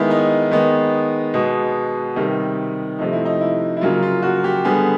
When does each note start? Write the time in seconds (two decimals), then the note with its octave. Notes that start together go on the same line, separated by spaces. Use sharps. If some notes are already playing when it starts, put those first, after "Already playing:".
Already playing: D#3 G#3 B3 E4
0.11 D#4
0.51 D#3 G#3 B3
1.34 B2 G#3 B3
2.16 C3 D#3 G3
2.99 C3 F3 A3 D#4
3.13 E4
3.25 D#4
3.41 E4
3.77 E4
3.81 C#3 F#3 A#3 F4
4.02 F4
4.22 F#4
4.44 G4
4.65 D3 G3 B3 G#4